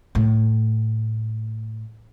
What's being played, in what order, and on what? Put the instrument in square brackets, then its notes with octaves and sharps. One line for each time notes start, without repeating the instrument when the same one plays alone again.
[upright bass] A2 A3